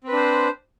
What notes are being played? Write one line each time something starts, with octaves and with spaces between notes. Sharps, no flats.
C4 D4 B4 C5